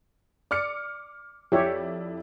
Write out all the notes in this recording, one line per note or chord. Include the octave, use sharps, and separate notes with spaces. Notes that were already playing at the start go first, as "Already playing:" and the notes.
D5 D6 F6 C#7
F2 E4 G4 C#5 D5 E5